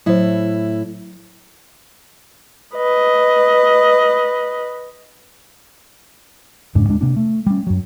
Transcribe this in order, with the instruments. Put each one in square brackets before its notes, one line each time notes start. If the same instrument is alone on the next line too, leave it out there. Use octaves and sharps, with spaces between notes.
[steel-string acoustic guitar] A2 E4 [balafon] F#3 C5
[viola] B4 D#5
[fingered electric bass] F2 G#2 C#3 D4
D1 G#3 D4
C3 A#3 D4
A3
G3 C#4
F#2 F#3